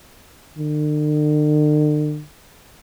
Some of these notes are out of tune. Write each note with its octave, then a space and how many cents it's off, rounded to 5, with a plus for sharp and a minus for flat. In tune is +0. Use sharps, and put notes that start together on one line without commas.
D3 +45